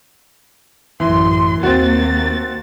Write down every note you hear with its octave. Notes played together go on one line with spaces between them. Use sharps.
A1 F#2 E3 C6
D#2 A#3 C4 F#4 A6